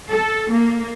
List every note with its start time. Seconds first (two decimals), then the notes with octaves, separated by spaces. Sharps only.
0.10 A4
0.51 A#3